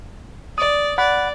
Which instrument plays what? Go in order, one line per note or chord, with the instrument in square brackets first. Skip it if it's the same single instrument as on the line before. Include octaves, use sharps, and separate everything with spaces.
[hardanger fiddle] D5 [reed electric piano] D#6
[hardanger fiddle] D5 [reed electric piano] F#5 B5 F#6